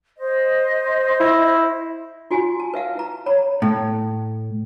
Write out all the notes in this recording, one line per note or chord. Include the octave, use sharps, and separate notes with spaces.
C5 D#5
E4
F4 F#4 G#5 C6
A5
B4 E5 F5
E4 A#5
C#5 A#5 B5
A2